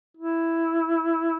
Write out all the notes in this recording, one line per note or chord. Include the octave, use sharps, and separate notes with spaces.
E4